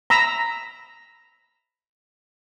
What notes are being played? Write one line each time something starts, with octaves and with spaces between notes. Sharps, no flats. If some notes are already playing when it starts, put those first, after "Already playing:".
A#5 B5 E6